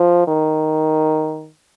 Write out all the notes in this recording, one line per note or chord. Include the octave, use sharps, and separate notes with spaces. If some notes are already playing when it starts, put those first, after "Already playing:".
Already playing: F3
D#3